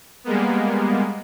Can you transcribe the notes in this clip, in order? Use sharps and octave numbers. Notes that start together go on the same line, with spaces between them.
G3 G#3 A#3 B3